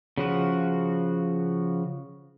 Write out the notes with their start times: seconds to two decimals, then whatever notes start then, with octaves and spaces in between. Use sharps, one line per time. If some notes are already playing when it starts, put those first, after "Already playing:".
0.18 C#3 F3 F#4